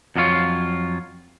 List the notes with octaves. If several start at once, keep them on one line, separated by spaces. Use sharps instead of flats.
F2 F#3 D4 F4 C#5 F5